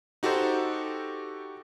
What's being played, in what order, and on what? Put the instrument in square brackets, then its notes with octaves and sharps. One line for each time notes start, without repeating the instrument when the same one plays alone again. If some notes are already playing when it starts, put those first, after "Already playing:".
[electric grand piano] D#4 F#4 G4 A4 C5